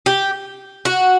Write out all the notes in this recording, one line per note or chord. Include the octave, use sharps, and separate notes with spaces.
G4
F#4